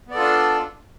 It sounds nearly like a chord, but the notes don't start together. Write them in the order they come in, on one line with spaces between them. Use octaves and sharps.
B3 D5 A4 F4 D4